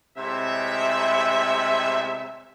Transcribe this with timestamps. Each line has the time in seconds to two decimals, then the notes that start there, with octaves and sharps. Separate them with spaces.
0.18 A2 C3 G#3 E5